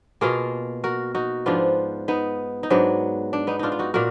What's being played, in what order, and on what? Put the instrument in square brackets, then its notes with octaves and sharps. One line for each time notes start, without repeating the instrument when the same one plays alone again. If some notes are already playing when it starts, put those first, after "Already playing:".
[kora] B2 A#3 F4 G#4
F#4 A#4
D#4 F#4
G#2 F3 B3 D4 F4
B3 D#4
D#4
G#2 F#3 B3 D4
D4
B3 D#4
D4 D#4 F4
F4
D#4 F#4
A#2 A#3 F#4 A#4